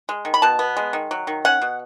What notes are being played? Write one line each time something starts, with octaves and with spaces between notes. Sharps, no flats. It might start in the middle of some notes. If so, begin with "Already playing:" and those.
G#3
D#3
B5
B2 A5
B3
G#3
D#3
F#3
D#3
C#4 F#5
B2